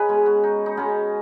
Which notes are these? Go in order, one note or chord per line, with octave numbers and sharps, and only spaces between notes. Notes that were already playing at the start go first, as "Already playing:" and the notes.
Already playing: C#4 D#4 G#4 B4
B2 G#3
F#4
D#4
D#4
B2 G#3 C#4